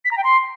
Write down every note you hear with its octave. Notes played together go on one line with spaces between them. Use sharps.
B6
A#5
G5
C6